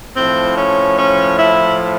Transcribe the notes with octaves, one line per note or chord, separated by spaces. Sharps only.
A2 F3 C4
C#4
C#4
E4